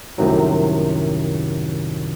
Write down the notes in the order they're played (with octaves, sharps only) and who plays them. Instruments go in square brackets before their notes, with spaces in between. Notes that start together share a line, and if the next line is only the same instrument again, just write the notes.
[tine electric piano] C2 F#2 A2 C3 D#3 F#3